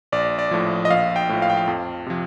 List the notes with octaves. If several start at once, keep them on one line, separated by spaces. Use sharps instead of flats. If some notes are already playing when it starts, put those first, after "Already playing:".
A#1 D5
D5
A2 F3
D#5
A#1 F5
G5
A2 F3
F5
G5
F5
F2
C3 F3